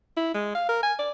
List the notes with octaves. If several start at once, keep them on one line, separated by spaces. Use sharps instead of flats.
E4
G#3
F5
A#4
G#5
D5